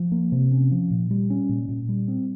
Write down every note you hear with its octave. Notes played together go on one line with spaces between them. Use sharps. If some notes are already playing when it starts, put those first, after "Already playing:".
Already playing: F3
A#3
C3
C#4
F3
A#2
G3
C#4
A#2
A#2
G3
C4